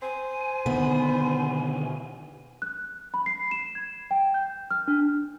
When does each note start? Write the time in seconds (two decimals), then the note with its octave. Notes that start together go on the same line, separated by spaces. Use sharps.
0.02 C5 G#5
0.66 B2 D3 D#3 B3
2.62 F#6
3.14 B5
3.26 C7
3.51 E7
3.75 G#6
4.11 G5
4.34 G6
4.71 F6
4.88 D4